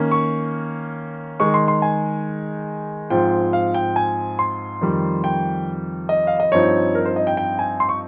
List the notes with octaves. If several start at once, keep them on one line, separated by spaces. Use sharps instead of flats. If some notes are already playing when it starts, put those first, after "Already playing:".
Already playing: D#3 A#3 C#4
C#6
D#3 G#3 D#4 C#6
C6
C6
G#5
G#2 F3 C4 F4 G5
F5
G5
G#5
C6
F2 D#3 G3
G5
D#5
F5
D#5
G2 F3 C4 D#4 C#5
A#4
C5
D#5
G5
G5
G#5
C6
C#6